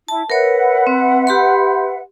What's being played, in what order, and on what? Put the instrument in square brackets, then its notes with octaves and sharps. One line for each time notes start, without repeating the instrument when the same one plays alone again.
[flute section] E4 [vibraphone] A5
[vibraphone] A#4 C#5 [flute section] B4 E5 F#5
[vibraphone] C4
G4 B5 C6